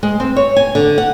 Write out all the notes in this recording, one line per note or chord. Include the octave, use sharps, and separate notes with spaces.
G#3
C4
C#5
G#5
D3
F#5